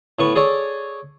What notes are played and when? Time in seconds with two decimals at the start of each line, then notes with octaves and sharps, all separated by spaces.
0.19 A2 B3 C#6
0.36 G#4 A4 C#5 D5